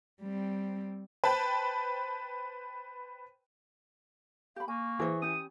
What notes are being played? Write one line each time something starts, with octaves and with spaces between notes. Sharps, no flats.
G3 C4
B4 C5 G5 A5 B5
G4 F5 B5
A#3 G#5 C#6
E3 G#4 C5
C#4 G4 D#6